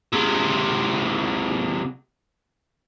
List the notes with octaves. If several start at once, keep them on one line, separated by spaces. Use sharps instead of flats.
C3 G#3